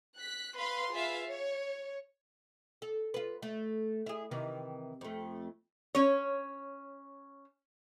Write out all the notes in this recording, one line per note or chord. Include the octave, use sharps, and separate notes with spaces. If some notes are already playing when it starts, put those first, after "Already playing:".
F#6 B6
B4 F5 B5 C6
F4 G#4 B4 E5 F5
C#5
A4
F4 B4
A3
E4 G#4
C3 D#3 E3
F2 A3
C#4 C#5